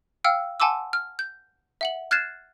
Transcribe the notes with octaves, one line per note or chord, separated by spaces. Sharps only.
F5 G5 E6 F6 C#7
F#5 G#5 A5 C6 D6 E6
F6
G6
E5 F#5 F#7
F6 F#6 G#6 A6 C7 E7